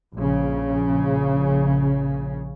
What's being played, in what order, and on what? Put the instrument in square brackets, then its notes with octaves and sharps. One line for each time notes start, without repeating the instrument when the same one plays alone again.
[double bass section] A#1 C#3